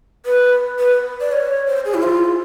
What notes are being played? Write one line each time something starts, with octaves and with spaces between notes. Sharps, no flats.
B4
B4
D5
C#5
C5
G#4
E4
F4